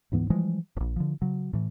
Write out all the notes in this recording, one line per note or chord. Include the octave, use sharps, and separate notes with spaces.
D2 G#2 E3 B3
E3 F3 G3 G#3
D1 A#1
D3 F3
C#3 F#3
A2 E3